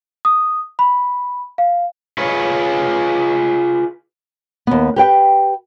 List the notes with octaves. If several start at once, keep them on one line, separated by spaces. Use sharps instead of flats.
D#6
B5
F5
F4 G#4 B4 C#5
D#2 B3
G4 B4 G5